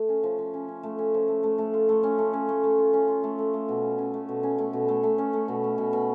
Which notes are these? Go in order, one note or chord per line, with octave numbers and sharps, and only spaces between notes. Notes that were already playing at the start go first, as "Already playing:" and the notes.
Already playing: A3
C#4
F3
F3
C#4
C#4
A3
C#4
F3
A3
A3
A3
F4
A3
C#4
A3
C#4
A3
A3
F4
C#4
F4
A3
A3
A3
B2
C#4
C#4
A3
B2
C#4
A3
B2
A3
A3
C#4
A3
B2
A3
B2
B2